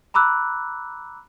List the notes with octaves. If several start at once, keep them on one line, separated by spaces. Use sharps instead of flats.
A#5 B5 D6 E6 F#6